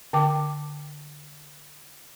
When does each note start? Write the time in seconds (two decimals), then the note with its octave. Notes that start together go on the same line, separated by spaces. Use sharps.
0.13 D3 G5 D6